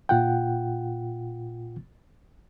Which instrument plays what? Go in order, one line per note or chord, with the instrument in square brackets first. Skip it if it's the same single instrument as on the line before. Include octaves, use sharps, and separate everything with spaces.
[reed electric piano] A#2 F4 F#5 G5